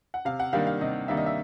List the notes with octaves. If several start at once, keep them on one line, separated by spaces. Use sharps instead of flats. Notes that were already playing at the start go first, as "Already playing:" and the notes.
F#5
C3 F5
F#5
D#3 G3 A#3 D4 F5
F5
C3 D#5
D#3 G3 A#3 D4 E5
D#5
E5